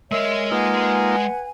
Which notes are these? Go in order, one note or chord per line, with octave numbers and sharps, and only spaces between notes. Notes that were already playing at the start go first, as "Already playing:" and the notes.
G#3 A#4 C#5 D#5 E5
A#3 D#4 F4 B4 F#5 G#5